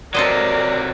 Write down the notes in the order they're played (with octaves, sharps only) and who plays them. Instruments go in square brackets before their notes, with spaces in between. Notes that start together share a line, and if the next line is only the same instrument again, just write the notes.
[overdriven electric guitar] C3 F#3 [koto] A4 C5 D#5 [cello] A#4 [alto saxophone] D5